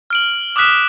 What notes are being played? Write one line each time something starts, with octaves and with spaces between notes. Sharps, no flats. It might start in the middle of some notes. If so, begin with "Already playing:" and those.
F6 D7 F#7
D6 D#6 F6 F#6 B6 E7